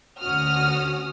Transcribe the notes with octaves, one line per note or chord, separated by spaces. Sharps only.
D2 C#4 F#4 D#6 F6